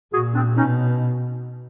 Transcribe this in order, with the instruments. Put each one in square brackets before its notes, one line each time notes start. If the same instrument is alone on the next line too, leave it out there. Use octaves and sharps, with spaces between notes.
[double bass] A#2 [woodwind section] F#4 G#4
[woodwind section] C4 D4
[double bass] B2 [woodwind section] C#4 D#4